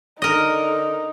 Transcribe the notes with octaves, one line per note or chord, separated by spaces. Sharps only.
D3 D#4 A#4 D#5